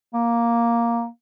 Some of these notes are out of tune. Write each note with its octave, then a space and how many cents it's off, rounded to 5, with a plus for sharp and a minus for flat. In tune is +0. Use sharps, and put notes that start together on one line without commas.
A#3 +5